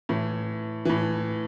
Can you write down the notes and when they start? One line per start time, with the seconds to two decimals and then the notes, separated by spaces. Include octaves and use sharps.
0.09 A2 E3
0.85 A2 E3